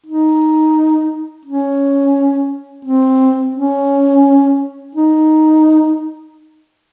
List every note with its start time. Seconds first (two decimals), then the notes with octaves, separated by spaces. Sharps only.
0.06 D#4
1.45 C#4
2.85 C4
3.56 C#4
4.95 D#4